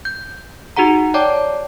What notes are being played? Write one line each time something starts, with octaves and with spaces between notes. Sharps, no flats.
G6
D#4 F#4 G#4 F#5 A#5
C#5 D5 G5 A5 D6